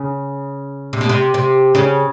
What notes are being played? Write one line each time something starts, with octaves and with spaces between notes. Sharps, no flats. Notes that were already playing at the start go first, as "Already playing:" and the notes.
Already playing: C#3
C3
B2
C3
C3
C#3